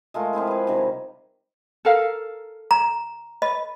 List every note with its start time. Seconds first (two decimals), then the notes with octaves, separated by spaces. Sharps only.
0.14 G#3 A3 F4 A#4
0.33 F3 C4 E4 G#4
0.47 G#4 B4
0.67 C3 D#3 G3
1.85 A4 A#4 F5
2.71 A#5
3.42 B4 D#5